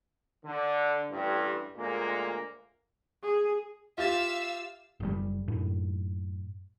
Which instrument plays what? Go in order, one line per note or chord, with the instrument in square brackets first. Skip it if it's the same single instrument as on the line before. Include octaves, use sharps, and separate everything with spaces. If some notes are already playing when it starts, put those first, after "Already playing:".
[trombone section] D3
A1 G2
D2 A#2 G#3 A#3
[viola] G#4
[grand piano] F4 G4 A6 [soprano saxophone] E5 [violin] F5 E6
[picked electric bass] F#1 B2 G3
F#2 A2